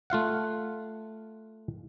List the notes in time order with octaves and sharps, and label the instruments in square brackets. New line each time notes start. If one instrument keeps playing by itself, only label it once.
[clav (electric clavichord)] A3 F4 F5 F#5